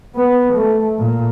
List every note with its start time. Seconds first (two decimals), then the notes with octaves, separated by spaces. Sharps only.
0.15 B3
0.53 A3
0.99 A#2